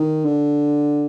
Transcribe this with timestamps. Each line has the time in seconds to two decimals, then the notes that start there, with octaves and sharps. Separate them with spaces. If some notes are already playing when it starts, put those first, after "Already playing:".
Already playing: D#3
0.25 D3